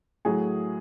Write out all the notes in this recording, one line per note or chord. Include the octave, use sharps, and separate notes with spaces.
A2 F#3 G#4